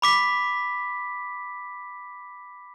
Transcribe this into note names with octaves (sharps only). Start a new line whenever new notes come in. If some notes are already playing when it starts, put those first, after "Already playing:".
B5 D6 B6